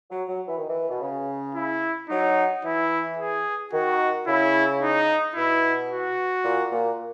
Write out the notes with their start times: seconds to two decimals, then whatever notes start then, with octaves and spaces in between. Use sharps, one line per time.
0.10 F#3
0.28 F#3
0.47 E3
0.57 D#3
0.68 E3
0.90 B2
1.00 C#3
1.55 E4
2.09 F#3 D#4
2.64 E3 E4
3.18 G#4
3.72 D#3 F#4
4.27 C#3 E4
4.82 D#4
5.35 B2 E4
5.90 F#4
6.44 A#2
6.72 A#2